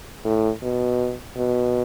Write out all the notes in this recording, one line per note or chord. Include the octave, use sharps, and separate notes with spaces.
A2
B2
B2